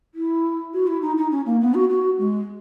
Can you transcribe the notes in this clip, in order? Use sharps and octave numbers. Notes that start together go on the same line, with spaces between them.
E4
F#4
E4
D#4
D#4
C#4
A#3
B3
F#4
F#4
G#3